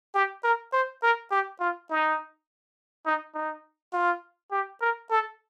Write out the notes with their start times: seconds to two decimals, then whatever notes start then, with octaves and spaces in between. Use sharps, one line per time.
0.15 G4
0.44 A#4
0.73 C5
1.03 A#4
1.31 G4
1.60 F4
1.90 D#4
3.06 D#4
3.35 D#4
3.93 F4
4.52 G4
4.81 A#4
5.11 A4